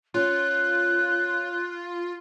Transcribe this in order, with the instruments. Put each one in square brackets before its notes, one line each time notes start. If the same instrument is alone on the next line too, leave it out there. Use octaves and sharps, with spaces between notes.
[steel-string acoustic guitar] C#4 [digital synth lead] F4 [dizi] F#6